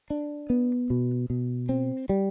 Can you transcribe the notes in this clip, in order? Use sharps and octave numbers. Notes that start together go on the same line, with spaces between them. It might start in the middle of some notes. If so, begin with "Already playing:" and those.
D4
B3
B2
B2
C4
G3